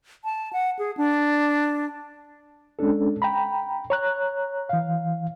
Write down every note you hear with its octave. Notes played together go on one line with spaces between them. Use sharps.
A5
F#5
G#4
D4
G#3 C#4 D4 A4
G5 A#5 B5
C#5 A#5 F#6
E3 F5